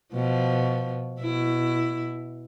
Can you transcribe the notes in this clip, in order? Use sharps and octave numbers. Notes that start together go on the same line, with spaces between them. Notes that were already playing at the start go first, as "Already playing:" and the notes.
B2 F3
B2 E4